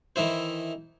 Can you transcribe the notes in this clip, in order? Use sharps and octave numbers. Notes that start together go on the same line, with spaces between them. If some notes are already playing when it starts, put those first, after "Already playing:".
D#3 E3 E4 C5